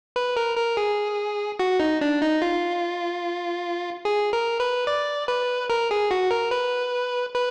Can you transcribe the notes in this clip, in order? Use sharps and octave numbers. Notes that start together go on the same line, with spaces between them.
B4
A#4
A#4
G#4
F#4
D#4
D4
D#4
F4
G#4
A#4
B4
D5
B4
A#4
G#4
F#4
A#4
B4
B4